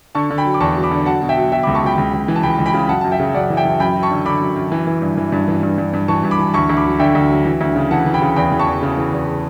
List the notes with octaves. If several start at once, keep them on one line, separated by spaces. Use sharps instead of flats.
D3 A5 C#6
D3
G5 B5
F#3
D6
E2 A5 C#6
F#3
B5 D6
D3
F#3 F#5 A5
B2
E5 G5
F#3
B2 E5 G5
C#2 B5 D6
A5 C#6
F#3 G5 B5
C#2
C#2
E3
A5
C#2 G5 B5
C#2
G5 B5
C#3
F#2 F#5 A5
F#2 A5
E5 G5
C#3
F#2 D5 F#5
E3
E5 G5
E3
F#2 G5 B5
F#3
A5 C#6
D3
D3 B5 D6
F#2
F#2
E3
E3
G2
E3
G2
E3
G2
G2
G2
E3 A5 C#6
G2
B5 D6
E3
D2 A5 C#6
D2
B5 D6
F#3
D3 E5 G5
D2
F#3
E3
D2
C#3
E3 F#5 A5
E3
G5 B5
C#3
E2 G5 B5
E3
A5 C#6
E2
C#3
E3
E2